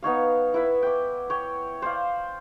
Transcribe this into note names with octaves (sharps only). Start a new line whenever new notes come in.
B3 D#4 C#5 F5
E4 B4 E5
G5 D6
C#5 G5
C5 D5 F5